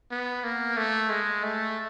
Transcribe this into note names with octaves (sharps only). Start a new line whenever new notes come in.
B3
A#3
A3
G#3
A3